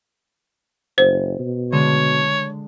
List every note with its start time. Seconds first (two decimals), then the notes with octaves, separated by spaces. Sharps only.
0.98 F#1 C5
1.39 B2
1.72 D3 G#3 C#5